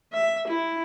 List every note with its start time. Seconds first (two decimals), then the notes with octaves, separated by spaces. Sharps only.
0.13 E5
0.48 E4